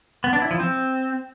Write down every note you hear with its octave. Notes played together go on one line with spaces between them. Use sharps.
B3
D4
E4
F3
C4